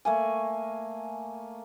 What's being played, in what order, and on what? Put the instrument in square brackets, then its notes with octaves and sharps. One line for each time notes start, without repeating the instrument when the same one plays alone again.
[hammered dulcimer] A3 A#3 G#5